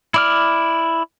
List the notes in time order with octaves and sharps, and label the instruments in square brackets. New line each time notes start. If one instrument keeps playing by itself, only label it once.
[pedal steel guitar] E4 D5 F6